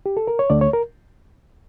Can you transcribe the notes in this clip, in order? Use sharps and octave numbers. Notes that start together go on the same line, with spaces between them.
G4
A4
A#4
C#5
D2 D3 A3 D5
C#5
A#4